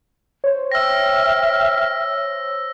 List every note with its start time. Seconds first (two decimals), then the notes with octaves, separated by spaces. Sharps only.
0.44 C5 C#5
0.72 E5 G5 E6 F6 A#6